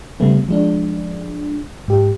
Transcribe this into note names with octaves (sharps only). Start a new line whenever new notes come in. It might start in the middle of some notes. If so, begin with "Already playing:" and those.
C#3 G3 A3 B3
F3 G#3 D4
G#2 G4